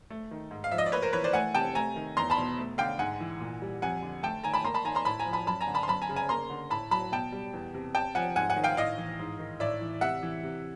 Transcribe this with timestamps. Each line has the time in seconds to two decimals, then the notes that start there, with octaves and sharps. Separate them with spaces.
0.10 A3
0.31 D#3
0.51 G#2
0.64 F5
0.71 F3 E5
0.78 D#5
0.86 D5
0.92 A#3 B4 C#5
1.02 A#4 C5
1.13 E3 B4 C#5
1.24 C5 D5
1.33 A3 F#5 G#5
1.55 C3 G5 A5
1.75 A3 G#5 A#5
1.96 D#3
2.17 E2 A#5 C6
2.30 A5 B5
2.38 B2
2.57 A3
2.78 D3 F5 G5
2.99 G#2 F#5 G#5
3.20 E3
3.40 A#2
3.62 G3
3.82 F2 F#5 G#5
4.02 D3
4.23 A3 G5 A5
4.44 D#3 G#5 A#5
4.54 A5 B5
4.64 A#3 A#5 C6
4.74 A5 B5
4.85 D#3 G#5 A#5
4.95 A#5 C6
5.05 A2 A5 B5
5.19 G#5 A#5
5.26 F3
5.33 A5 B5
5.47 F#2 A5 B5
5.61 G#5 A#5
5.67 D3
5.74 A5 B5
5.83 C6
5.88 F#2 A5 B5
6.02 G#5 A#5
6.09 C#3
6.16 G#5 A#5
6.29 A#3 A#5 C6
6.50 D3
6.70 A2 A5 B5
6.91 F#3 A5 B5
7.12 B2 G5 A5
7.32 G3
7.53 E2
7.74 C3
7.95 C3 G5 A5
8.15 F3 F#5 G#5
8.36 G#2 F#5 G#5
8.50 F#5 G#5
8.56 D#3
8.64 F5 G5
8.77 A2 D#5 F5
8.98 E3
9.19 G#2
9.39 D#3
9.60 A2 D5 E5
9.81 E3
10.01 C3 E5 F#5
10.23 E3
10.43 C3